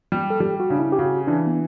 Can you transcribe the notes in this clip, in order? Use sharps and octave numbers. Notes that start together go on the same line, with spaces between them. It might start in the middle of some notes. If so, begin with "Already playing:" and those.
G3
A4
G3 G4
F#4
C#3 D4
E4
G4
C#3 F#4
E3 D4
B3